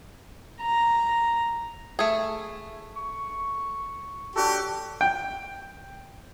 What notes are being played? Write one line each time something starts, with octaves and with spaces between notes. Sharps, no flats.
A#5
A3 G#4
C#6
D4 F#4 G4 A4
G5